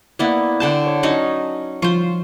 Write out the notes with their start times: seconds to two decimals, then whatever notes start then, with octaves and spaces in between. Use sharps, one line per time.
0.19 A#3 B3 E4 D5 F#5
0.60 D3 C5 F#5 G5 A5 G6
0.86 C#5
1.03 F#3 C#4 D#4
1.82 F3 F4 C5 C#6